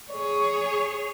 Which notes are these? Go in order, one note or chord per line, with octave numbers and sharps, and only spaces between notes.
G#4 C#5